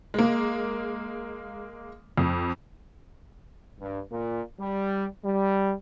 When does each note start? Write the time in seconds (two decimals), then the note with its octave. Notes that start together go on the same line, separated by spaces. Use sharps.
0.14 G#3 A#3
2.18 F2
3.80 G2
4.11 A#2
4.59 G3
5.24 G3